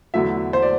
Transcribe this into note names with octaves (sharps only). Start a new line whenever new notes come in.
E2 D3 F#3 A3 E4 E5
C5
D5